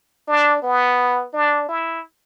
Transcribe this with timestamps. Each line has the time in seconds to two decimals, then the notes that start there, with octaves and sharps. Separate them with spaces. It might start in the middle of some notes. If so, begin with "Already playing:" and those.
0.28 D4
0.62 B3
1.33 D4
1.69 E4